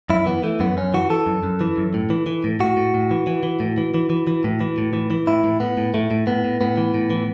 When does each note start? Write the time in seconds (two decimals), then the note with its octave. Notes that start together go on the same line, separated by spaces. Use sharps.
0.10 F#2 E4
0.26 E3 B3
0.43 E3 A3
0.60 F#2 B3
0.77 F#2 C#4
0.94 E3 F#4
1.10 E3 A4
1.26 F#2
1.43 F#2
1.61 E3
1.77 F#2
1.94 A2
2.10 E3
2.26 E3
2.44 A2
2.60 A2 F#4
2.77 A2
2.94 A2
3.11 E3
3.27 E3
3.43 E3
3.60 A2
3.78 E3
3.94 E3
4.10 E3
4.27 E3
4.44 A2
4.61 E3
4.78 A2
4.93 E3
5.11 E3
5.27 A2 E4
5.44 A2
5.60 A2 B3
5.78 A2
5.94 A2 A3
6.11 A2
6.27 A2 B3
6.45 A2
6.61 A2 B3
6.77 E3
6.94 A2
7.10 E3